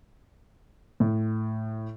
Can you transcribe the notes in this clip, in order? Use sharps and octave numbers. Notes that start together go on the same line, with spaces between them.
A2